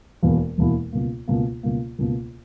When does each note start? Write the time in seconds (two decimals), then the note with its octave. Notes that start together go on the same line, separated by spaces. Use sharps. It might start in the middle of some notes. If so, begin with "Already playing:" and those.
0.23 E1 E2 B2 A#3 E4
0.58 E1 E2 B2 A#3 E4
0.92 C#2 B2 A#3
1.28 C#2 B2 A#3
1.63 C#2 B2 A#3
1.99 C#2 B2 A#3